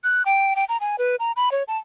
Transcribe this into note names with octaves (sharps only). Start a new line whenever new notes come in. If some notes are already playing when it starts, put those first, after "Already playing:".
F#6
G5
G5
A#5
G#5
B4
A#5
B5
C#5
A5